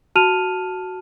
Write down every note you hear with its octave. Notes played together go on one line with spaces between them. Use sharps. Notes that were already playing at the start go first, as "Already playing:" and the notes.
F#4 A5 F6 D#7 F7